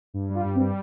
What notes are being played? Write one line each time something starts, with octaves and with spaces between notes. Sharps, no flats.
G2
G3
F4
G2
C4
G3